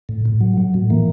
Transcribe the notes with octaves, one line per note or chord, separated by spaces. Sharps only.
A2
A2
F#3
F#3
A2
E3 A#3